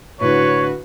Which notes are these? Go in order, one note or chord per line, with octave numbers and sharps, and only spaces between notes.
A2 D3 F#4 B4 C#5